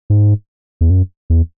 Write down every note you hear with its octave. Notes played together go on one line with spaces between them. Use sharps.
G#2
E2
F#2
E2